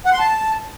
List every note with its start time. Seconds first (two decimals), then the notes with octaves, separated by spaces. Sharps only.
0.06 F#5
0.12 C6
0.19 A5